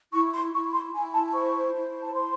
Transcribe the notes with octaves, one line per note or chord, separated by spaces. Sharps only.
E4 C#6
C6
E4 C#6
C6
E4 G#5
A5
C5 C#6
E4
A5
C5 C6